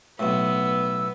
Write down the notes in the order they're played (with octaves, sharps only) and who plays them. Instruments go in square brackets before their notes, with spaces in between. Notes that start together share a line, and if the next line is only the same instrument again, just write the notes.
[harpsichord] B1 A2 [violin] B3 [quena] E6